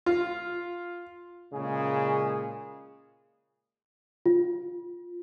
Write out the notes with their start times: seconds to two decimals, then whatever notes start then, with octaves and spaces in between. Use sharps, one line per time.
0.06 F4
1.53 A#2 C#3 G#3 G#4
4.26 F4